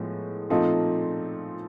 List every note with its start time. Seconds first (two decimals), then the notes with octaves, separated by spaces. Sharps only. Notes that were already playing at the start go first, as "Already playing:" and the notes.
Already playing: A2 F3 G#3 B3
0.50 A#2 F3 A3 C4 D#4